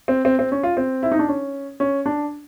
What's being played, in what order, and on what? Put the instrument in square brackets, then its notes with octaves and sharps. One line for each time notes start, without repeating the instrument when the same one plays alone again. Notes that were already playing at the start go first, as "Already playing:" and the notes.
[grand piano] C4
C4
C4
C#4
F4
C4
E4
D#4
D4
C#4
C#4
D4